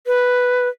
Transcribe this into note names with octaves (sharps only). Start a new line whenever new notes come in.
B4